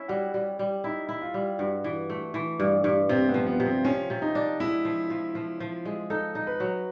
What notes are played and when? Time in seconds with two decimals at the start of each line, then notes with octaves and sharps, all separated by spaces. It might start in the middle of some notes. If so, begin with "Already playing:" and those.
Already playing: C#4 E4
0.08 G3 F#4
0.34 G3
0.59 G3
0.84 D#4 E4
1.09 E4
1.22 F4
1.34 G3
1.59 G2 F#4
1.84 E3
2.10 A3
2.34 E3
2.60 G2
2.84 G2
3.09 C3 C4
3.29 B3
3.34 F3
3.47 B3
3.60 C3
3.65 C4
3.84 F3 C#4
4.10 C3
4.22 D#4
4.35 D4
4.60 G#3 E4
4.85 F3
5.10 F3
5.35 F3
5.60 F3
5.85 G#3
6.10 D#4 A4
6.35 D#4
6.47 B4
6.60 F#3